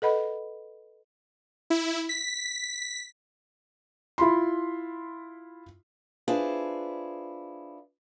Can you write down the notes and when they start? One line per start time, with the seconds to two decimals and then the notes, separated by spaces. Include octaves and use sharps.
0.02 A4 B4 D#5 F#5 B5
1.70 E4
2.09 B6
4.18 E4 F4 B5 C6
6.28 D4 E4 F4 G#4 B4 C5